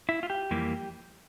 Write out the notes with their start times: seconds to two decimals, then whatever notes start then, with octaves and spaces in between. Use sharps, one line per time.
0.09 E4
0.23 F4
0.30 G4
0.51 F2 E3 G3 A#3